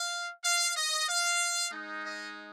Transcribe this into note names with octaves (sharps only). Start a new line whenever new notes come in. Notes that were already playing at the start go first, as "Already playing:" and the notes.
Already playing: F5
F5
D#5
F5
G#3 D#4
D#5